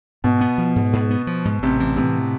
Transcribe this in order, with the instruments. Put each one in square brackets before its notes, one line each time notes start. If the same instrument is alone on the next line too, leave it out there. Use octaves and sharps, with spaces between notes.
[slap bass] G#2 [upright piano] B2
[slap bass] B3
F3
G#2
G#2
B3
F3
G#2
[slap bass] A1 [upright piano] C3
[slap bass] E3
[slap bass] A2 [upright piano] C3